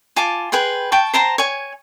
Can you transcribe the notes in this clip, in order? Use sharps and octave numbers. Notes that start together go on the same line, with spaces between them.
F4 G#5 A5 D6
G#4 B4 G5 C6
G5 A5 C#6
C5 A5 A#5 C6
C#5 G#5